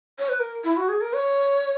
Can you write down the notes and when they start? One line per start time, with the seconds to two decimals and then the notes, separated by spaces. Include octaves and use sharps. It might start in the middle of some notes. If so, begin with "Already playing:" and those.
0.19 C#5
0.29 B4
0.40 A#4
0.64 E4
0.77 F#4
0.89 G#4
1.01 A#4
1.13 C#5